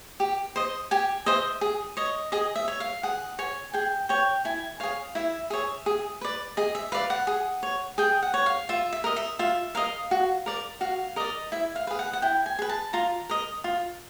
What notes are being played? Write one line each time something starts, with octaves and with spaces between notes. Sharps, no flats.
G4
C5 D#5
G4 G#5
C5 D#5 E5
G#4
C#5 D#5
G#4 D#5
E5
C#5
F5
G#4 F#5
C#5 G#5
G#4 G5
C#5 G5
E4 G#5
G#4 C#5 F5
E4 E5
G#4 C#5 E5
G#4
B4 D5
G#4 D#5
E5
B4 D5 F5
F#5
G#4
C#5
G#4 G5
F#5
C#5
F5
F4 E5
E5
A#4 D#5
E5
F4 E5
A#4 D#5 F5
F#4
A#4 D5
F#4 F5
A#4 D5 D#5
E4 E5
F5
G#4 B4
F#5
F#5
E4 G5
G#5
G#4 B4
A5
F4 A#5
A#4 D#5
F4